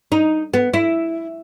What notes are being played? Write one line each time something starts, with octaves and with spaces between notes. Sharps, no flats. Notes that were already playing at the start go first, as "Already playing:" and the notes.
D#4
B3
E4